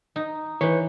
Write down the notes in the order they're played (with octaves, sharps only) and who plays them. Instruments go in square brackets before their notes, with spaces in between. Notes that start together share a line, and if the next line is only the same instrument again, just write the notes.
[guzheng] D#4
[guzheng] E3 [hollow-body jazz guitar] B4 C#5